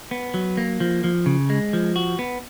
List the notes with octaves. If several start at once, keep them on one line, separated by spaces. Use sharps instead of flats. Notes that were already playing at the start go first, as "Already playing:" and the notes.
B3
F#3
A#3
F3
F3
C#3
G#3
F3
F#4
B3